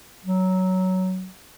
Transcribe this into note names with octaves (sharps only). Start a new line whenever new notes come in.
F#3